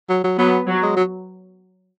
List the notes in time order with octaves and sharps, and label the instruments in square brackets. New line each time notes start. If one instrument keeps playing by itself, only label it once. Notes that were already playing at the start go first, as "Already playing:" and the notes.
[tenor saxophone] F#3
F#3
[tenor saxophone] F#3 [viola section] B3
[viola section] F#3
[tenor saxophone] G#3
F#3